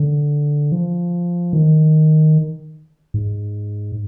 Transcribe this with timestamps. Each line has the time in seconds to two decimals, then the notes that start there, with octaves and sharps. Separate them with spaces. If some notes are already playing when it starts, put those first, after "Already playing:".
Already playing: D3
0.72 F3
1.53 D#3
3.14 G#2